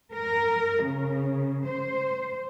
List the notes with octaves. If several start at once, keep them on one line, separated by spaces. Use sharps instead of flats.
A#4
C#3
C5